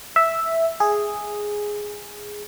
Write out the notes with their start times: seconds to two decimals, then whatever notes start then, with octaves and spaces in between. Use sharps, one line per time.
0.16 E5
0.80 G#4